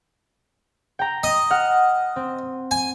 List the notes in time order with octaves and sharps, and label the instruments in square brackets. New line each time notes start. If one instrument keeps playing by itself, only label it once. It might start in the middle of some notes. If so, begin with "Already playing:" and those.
[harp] G5 A#5
[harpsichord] D#5
[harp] F#5 F6
C4
[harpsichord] G#5